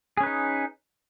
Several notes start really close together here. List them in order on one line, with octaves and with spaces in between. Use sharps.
G#4 C#4 B4 D#4